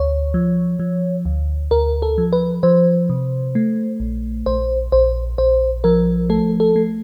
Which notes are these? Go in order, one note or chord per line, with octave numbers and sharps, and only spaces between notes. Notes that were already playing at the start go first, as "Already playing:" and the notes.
Already playing: D2 C#5
F3
F3
D2
D2 A#4
A4
F3
B4
F3 C5
C3
A3
A#1
A#1 C5
A#1 C5
A#1 C5
F3 A#4
A3 A4
A4
A3